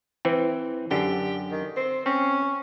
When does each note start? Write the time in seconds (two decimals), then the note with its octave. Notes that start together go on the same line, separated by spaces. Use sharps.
0.25 E3 C4
0.91 F#2 D3 G4
1.51 D#3
1.76 C4
2.06 C4 C#4